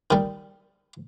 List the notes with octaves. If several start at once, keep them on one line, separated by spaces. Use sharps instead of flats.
D#3 G3